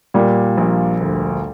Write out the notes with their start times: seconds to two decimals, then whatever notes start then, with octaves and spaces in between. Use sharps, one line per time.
0.14 A#2 G3
0.57 A#1
1.01 D2